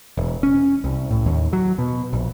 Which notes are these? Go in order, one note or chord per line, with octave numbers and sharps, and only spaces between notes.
E1
C#4
C2
A2
D#2
F#3
B2
A#1